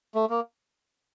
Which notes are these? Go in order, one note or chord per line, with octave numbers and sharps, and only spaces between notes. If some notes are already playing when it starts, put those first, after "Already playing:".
A3
A#3